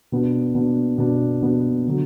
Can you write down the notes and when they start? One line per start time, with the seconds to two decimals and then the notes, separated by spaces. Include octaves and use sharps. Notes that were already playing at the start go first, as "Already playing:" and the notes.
0.12 B2 B3 D4
0.55 B2 B3 D4
0.98 B2 B3 D4
1.42 B2 B3 D4
1.87 D3 F#3